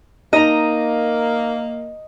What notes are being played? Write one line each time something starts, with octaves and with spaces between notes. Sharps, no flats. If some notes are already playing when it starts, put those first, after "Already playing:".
A#3 D#4 D#5 A#5